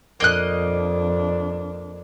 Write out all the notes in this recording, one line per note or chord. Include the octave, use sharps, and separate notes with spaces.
F2 A#3 D4 D#5 F#6